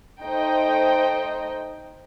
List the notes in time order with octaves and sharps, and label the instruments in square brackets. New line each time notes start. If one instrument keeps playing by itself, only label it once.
[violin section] A3 D#4 C5 D#5 G5